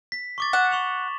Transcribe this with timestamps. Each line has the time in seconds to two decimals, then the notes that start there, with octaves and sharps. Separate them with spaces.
0.12 B6
0.38 C#6 D6 A6
0.53 F#5 E7
0.71 C#6 F7 F#7